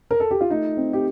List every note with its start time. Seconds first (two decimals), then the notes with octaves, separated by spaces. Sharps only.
0.11 A#4
0.20 A4
0.31 G4
0.41 F4
0.50 A3 D#4
0.77 C4
0.93 G4